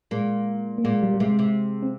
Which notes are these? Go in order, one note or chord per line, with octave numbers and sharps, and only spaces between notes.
A#2 G#3
A#3
A#2 G#3
G3
G3
C3 G#3
C3
C4